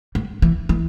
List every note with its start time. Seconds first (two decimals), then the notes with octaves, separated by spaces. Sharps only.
0.15 G3
0.42 E3
0.69 E3